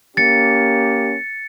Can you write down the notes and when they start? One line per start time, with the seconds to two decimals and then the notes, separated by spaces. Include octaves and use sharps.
0.17 A#3 C#4 G4 A6 C#7